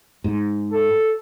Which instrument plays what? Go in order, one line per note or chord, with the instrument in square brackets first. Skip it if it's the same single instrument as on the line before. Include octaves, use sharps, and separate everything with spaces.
[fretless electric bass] G#2
[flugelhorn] A4